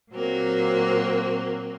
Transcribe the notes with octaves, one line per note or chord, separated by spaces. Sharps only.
A#2 F#3 A#3 C4